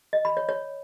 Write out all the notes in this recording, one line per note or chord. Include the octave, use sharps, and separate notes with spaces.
D#5
B5
C#5
C#5